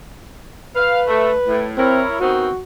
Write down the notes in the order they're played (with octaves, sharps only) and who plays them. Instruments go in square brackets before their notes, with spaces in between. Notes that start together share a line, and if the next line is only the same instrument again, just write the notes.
[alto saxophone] B4 [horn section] F5
[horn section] A3
A2
[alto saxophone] C4 [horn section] E4 A#4 C#5
[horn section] D#3 B3 C4 [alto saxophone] F#4